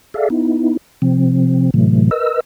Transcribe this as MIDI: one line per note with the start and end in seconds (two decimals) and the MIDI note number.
0.14 0.29 68
0.14 0.29 69
0.14 0.29 74
0.14 0.29 76
0.14 0.29 77
0.30 0.77 59
0.30 0.77 63
0.30 0.77 64
1.02 1.70 48
1.02 1.70 53
1.02 1.70 60
1.74 2.10 45
1.74 2.10 48
1.74 2.10 52
1.74 2.10 54
1.74 2.10 57
2.11 2.40 70
2.11 2.40 71
2.11 2.40 75
2.11 2.40 88